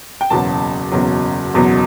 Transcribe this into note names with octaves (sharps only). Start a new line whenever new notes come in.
G5
F#1 E2 B2 F#3 A5
F#1 E2 B2 F#3
F#1 E2 B2 F#3